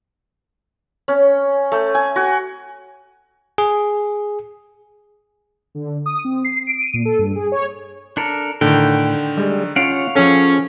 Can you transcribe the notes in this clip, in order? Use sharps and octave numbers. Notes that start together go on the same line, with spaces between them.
C#4
A3
G#5
F#4
G#4
D3
D#6
C4
C7
D7
D#7
A#2
A4
G2
G#4
C#5
D4 A4 A#4
A2 D3 D#3 G5
G3 G#3
C#4 F4 C#5 F5 F#5 D7
F3 C#4 G#4 A4